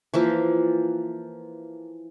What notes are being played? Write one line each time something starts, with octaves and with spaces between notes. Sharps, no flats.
E3 F3 A#3